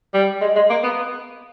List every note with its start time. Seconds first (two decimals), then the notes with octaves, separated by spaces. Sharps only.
0.14 G3
0.41 G#3
0.56 G#3
0.70 A#3
0.84 B3